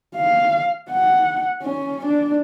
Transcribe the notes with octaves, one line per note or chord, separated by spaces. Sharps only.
F5
F#5
C#4
D4